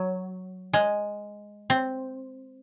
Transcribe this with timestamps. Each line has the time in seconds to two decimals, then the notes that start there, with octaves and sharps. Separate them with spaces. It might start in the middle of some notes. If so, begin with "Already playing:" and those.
Already playing: F#3
0.73 G#3
1.70 C4